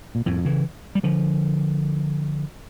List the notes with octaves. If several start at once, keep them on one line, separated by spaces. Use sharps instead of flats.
A#2
F2 A2
C#3 E3
G3
D3 F3